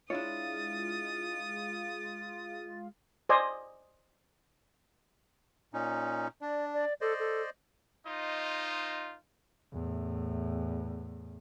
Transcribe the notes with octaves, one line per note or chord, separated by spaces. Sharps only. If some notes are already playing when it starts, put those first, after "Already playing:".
G#3 D4 E4 F4 C#5 F5 D#6 A6
C5 D5 D#5 G#5
A#2 C#4 D#4
D4 D5
D5
A4 C5 D5 D#5
A4
D#4 F4 C5 D#5
E2 A2